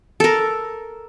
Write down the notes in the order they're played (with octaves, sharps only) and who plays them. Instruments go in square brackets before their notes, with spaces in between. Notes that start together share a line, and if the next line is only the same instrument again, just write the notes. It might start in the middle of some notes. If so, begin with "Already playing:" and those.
[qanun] A4 A#4